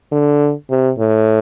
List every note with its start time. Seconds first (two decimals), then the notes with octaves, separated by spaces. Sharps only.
0.12 D3
0.70 C3
0.99 A2